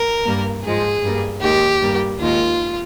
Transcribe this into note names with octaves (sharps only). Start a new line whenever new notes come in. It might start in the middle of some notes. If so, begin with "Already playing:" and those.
Already playing: A#4
G2 G3 A#3
G#2 F3 G#3 G#4
G2 G3 A#3
D#2 D#3 G#3 G4
G2 G3 A#3
D#2 D#3 G#3 F4